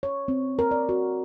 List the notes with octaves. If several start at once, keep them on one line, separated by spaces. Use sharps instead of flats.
C#5
C4
A#4
D5
F#4